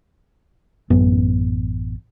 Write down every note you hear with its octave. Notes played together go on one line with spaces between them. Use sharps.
A1 F#2 B3